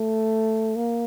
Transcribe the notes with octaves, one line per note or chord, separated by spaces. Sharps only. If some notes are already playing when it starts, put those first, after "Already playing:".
Already playing: A3
A#3